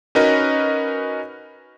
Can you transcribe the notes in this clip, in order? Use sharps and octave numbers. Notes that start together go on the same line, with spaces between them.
C#4 D#4 F#4 A#4 B4 D#5